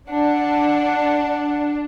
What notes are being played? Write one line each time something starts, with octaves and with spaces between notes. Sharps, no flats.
D4 F#5